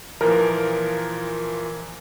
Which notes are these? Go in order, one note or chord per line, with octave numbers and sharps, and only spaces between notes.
A#2 E3 F3 A#4